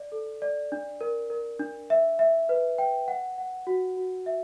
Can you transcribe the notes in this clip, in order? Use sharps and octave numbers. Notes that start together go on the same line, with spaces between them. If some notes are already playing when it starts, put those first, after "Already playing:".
Already playing: D5
A4
D5
D4
A#4
A#4
D4
E5
E5
B4
G5
F#5
F#5
F#4
F#4
E5